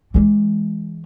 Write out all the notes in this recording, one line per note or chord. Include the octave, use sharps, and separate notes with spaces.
E3 G#3